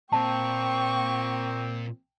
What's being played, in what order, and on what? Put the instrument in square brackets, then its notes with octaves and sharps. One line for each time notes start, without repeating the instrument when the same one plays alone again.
[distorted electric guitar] A#2 F4 [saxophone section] A#3 C4 [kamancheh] G5 C#6 [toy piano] A5